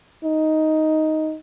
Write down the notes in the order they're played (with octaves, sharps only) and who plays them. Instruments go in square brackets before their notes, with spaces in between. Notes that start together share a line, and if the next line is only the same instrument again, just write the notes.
[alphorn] D#4